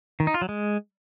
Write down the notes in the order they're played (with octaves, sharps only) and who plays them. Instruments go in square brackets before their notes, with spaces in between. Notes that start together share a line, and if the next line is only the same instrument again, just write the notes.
[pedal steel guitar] D#3
D#4
F4
F#3
G#3